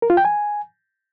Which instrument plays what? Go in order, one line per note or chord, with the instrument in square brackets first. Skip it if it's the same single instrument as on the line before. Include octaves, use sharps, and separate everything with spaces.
[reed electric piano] A#4
F4
G5
G#5